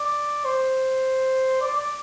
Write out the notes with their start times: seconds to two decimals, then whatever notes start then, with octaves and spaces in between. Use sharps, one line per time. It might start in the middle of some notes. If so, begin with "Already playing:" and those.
Already playing: D5
0.45 C5
1.61 D5
1.75 D5